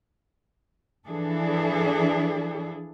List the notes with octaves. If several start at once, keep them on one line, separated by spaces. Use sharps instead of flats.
E3 F3 D4 G#4 A4